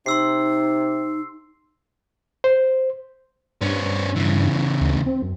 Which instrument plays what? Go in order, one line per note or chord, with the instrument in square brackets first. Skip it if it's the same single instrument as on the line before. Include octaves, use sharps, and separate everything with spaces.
[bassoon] C3 [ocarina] D#4 [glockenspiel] C6 E6 C7
[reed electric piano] C5
[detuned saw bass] G2 [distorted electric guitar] B3 C#4
[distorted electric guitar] C#3 E3
[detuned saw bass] D2
C4
F#2